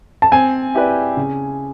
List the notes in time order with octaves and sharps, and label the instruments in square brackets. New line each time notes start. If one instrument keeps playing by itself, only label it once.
[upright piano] A5
[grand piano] C4 [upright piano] G#5
[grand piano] E4 G4 B4 D5
C#3